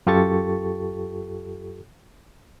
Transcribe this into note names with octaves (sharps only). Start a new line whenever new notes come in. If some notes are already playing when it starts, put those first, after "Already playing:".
F#2 F4 G4 A4 C#6 A6